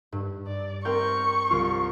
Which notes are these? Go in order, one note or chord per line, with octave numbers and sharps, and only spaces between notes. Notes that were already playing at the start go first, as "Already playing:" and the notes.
G2
D5
C4 A#4 G5 C#6
C2 F4